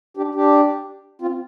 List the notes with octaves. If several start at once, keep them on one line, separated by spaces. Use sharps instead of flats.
D4 G4
D4 G4
C4 F4